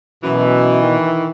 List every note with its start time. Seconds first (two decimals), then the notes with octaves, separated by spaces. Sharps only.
0.24 F#2 B2 E3
0.83 D#3